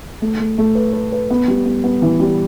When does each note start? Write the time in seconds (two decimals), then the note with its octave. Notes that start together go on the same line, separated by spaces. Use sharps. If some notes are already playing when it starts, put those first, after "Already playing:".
0.22 A3
0.40 A3
0.58 A3
0.75 B4
0.93 B4
1.12 B4
1.31 B3
1.48 G3
1.65 B3
1.84 B3
2.02 E3
2.20 G3